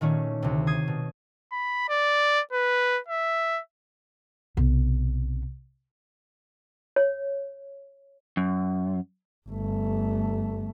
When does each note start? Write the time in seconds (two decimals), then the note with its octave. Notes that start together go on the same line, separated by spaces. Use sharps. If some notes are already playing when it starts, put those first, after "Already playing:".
0.01 A#2 D#3 A3 C#4
0.43 D2 C3
0.67 D#6 G#6 C7
0.88 B2
1.52 B5
1.89 D5
2.53 B4
3.08 E5
4.57 B1 C3
6.96 C#5
8.37 F#2
9.49 G1 A3